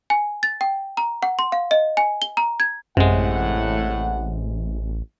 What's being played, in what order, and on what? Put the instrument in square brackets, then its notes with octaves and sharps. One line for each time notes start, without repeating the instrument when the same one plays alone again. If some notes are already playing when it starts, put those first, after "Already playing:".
[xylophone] G#5
A6
G5
A#5
F#5
C6
F5
D#5
G#5
G7
A#5
G#6
[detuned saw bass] A1 [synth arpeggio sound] F#2 [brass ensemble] A2 F#5 [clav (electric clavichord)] C3 G#3